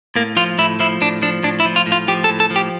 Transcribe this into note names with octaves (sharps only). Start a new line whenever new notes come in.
A2 A#3
F3 F4
A2 E4
F3 E4
A2 D4
F3 D4
A2 D4
E4
F3
F4
A2
F4
F3 G4
A4
A2
A4
F3
G4